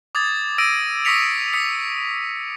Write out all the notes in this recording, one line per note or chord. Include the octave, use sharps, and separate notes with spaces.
D6 D#6 G#6 A6
E6 A#6 D7 D#7
C#6 D#6 A#6 B6 C#7 F7
D#6 B6 C#7